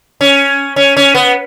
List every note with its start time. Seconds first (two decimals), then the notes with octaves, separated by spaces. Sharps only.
0.21 C#4
0.76 C#4
0.97 C#4
1.15 B3